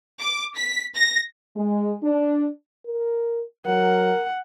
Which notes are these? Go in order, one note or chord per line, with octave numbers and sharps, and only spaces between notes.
D6
B6
A#6
G#3
D4
A#4
F#3 A#4 F#5